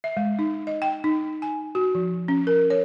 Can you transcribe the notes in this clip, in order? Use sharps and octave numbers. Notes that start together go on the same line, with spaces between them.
E5
G#3
D#4
D#5
G5
D#4
G#5
F#4
F3
C#4
A#4
C#5